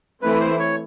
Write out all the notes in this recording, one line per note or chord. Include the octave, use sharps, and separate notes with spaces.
E3 A3 C4 E4 B4
C5
C#5